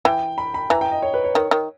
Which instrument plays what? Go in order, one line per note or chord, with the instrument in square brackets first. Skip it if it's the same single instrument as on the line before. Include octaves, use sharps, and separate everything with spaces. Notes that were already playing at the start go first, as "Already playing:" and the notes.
[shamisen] E3 [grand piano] G5
[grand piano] B5
B5
[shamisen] E3 [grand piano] A#5
[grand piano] G5
D#5
C#5
B4
C#5
[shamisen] D#3
D#3